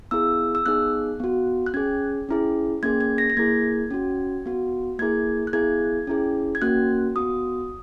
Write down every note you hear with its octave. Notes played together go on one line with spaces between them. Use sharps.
B3 E4 G#4 E6
E6
B3 D#4 G#4 F#6
B3 F#4
F#6
C#4 G#4 G#6
C#4 E4 G#4
A#3 C#4 G#4 G#6
G#6
A#6
A#6
A#3 E4 G#4 G#6
C#4 F#4
B3 F#4
A#3 E4 G#4 G#6
F#6
B3 E4 G#4 G#6
C#4 E4 G#4
G#6
A#3 C#4 F#4 F#6
B3 F#4 D#6